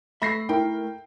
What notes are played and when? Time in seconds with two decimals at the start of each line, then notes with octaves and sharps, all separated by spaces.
0.22 A3 E5 B5 A#6 C7
0.49 E4 A#4 G5